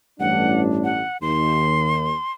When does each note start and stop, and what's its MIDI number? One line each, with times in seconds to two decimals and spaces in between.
0.20 1.02 33
0.20 1.02 43
0.20 1.02 62
0.20 0.61 78
0.84 1.17 78
1.22 2.13 39
1.22 2.32 84